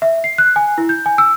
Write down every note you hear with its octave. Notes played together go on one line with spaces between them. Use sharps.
E5
C7
F#6
G#5
E4
G6
G#5
E6